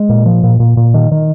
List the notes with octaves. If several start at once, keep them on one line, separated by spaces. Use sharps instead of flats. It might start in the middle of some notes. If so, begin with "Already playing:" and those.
Already playing: G#3
A#2
F3
A#2
A#2
A#2
D#3
D#3